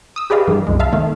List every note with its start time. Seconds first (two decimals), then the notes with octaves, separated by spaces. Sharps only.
0.16 D#6 E6
0.30 G4 G#4 B4 D5 D#5 F5
0.47 G2 E3 G3 A#3
0.67 C2 F#2 G#3
0.80 E5 F5 A5
0.92 D#3 A3 A#3